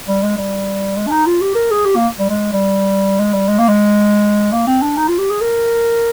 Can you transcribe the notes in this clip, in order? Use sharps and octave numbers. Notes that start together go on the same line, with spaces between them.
G3
G#3
G3
G#3
D4
D#4
F4
G4
A#4
G#4
G4
A#3
G3
G#3
G3
G#3
G3
G#3
A#3
G#3
A#3
C4
D4
D#4
F4
G4
G#4
A#4